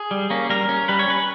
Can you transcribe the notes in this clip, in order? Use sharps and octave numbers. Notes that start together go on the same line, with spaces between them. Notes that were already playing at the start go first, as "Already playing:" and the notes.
Already playing: G#4
G3
A#3 C#4
G3 A#4
C#4
G3 B4
C#5
C#4 B4